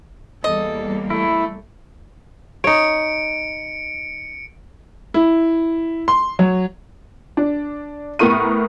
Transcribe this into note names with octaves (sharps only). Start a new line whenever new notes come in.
E2 G3 A#3 A4 D#5
A3 E4
D#4 C#5 C#7 D7
E4
C6
F#3
D4
A2 B3 A#4 C#6 D#7